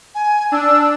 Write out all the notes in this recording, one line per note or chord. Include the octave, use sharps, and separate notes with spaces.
G#5
D4 E6